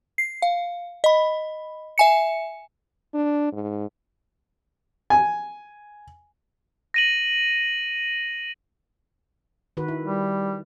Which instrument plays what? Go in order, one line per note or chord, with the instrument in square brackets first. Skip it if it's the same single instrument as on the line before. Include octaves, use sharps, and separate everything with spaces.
[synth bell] C7
F5
D#5 B5
E5 G#5 C#7
[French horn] D4
G#2
[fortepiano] G#5
[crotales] A#6 D#7 F#7
[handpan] D#3 F#4 B4
E4
[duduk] G3